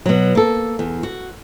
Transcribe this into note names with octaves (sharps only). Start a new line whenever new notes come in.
B2 F#3
A#3 A4
E2
F#4